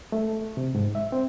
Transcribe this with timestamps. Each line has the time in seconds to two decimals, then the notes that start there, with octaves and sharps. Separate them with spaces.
0.12 A3
0.57 C3
0.75 G#2
0.95 E5
1.12 C4